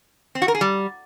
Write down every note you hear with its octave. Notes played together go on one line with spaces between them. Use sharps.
C4
F#4
A#4
G#4
G3